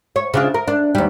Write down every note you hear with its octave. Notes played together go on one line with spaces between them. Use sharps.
C#5
C#3 D4 F4
A#4
D4
D#2 G3